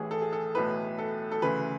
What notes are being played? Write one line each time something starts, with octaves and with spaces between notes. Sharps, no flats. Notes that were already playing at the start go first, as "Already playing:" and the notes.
Already playing: A1 A2 E3 G#4
A4
G#4
A4
B1 A2 E3 B4
A4
A4
D2 C#3 E3 B4